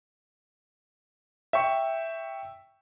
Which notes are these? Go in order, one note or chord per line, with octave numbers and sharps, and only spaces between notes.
E5 G5 C#6